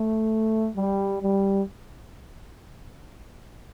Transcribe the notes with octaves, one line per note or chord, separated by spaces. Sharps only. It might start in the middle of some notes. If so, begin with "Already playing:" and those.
Already playing: A3
G3
G3